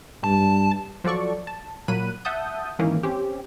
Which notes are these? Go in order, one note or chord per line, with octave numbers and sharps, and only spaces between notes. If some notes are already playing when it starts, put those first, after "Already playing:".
G2 A5
F3 F#3 A4 D5 C#6
A5
A#2 F#3 B5 F#6 D#7
E5 F#5 A5 D#6 G6
G#2 D#3 E3 A#3 C#4
C4 C#4 G4